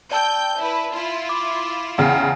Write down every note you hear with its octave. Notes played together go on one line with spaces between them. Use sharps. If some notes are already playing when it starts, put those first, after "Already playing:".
D5 G5 A5 E6 G6
E4 B4
E4 F4
D6
E2 C#3 F#5 G5